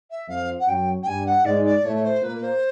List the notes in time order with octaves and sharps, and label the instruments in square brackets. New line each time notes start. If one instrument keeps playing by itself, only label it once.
[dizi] E5
[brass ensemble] F2 F3 [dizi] F5
[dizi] F#5
[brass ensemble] F#2 F#3 [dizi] G5
[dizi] G5
[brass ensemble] G2 G3 [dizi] G#5
[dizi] F#5
[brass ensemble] G#2 G#3 [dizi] D5
[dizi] D5
[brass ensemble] A2 A3 [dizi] C#5
[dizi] C5
[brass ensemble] A#2 A#3 [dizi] B4
[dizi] C5